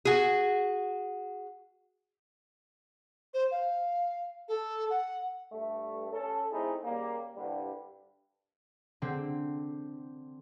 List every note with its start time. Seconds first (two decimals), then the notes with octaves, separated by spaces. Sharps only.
0.05 F#4 G#4
3.34 C5
3.51 F5
4.48 A4
4.90 F#5
5.53 G2 A3
6.12 C#4 A4
6.52 A3 C4 D#4 E4 G#4
6.84 C#3 G3 A#3
7.36 C2 G2 D3 G3
9.02 D3 C4